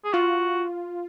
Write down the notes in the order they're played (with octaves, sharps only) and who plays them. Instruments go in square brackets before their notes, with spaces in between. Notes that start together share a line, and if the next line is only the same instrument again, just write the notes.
[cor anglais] G#4
[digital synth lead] F4 [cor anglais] F#4